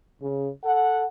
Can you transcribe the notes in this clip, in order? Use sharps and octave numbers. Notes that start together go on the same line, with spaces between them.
C#3
A4 F#5